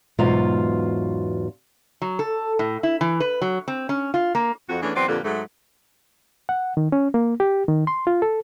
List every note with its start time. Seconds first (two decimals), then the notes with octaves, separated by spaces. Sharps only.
0.19 E2 G#2 B2 F#3 F4 F5
2.02 F#3
2.19 A4
2.59 A2
2.83 E4
3.01 E3
3.20 B4
3.42 F#3
3.68 C4
3.89 C#4
4.14 F4
4.35 A#3
4.69 F2 F#4
4.82 E3 A3 B3 C#4 D4 G#4
4.94 E2 F#3 C4 B4 C5 D5
5.07 F2 A#2 D3 A#3 G4 B4
5.23 G#2 F#3 G#3 A3
6.49 F#5
6.77 D#3
6.92 C#4
7.14 A#3
7.40 G4
7.68 D#3
7.87 C6
8.07 F4
8.22 A4